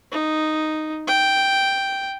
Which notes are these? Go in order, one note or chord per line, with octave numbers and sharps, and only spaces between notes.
D#4
G5